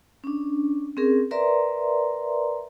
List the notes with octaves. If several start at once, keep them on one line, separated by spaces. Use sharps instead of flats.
C#4 D4
C4 C#4 G#4 A#4
A#4 B4 D5 E5 A#5 C6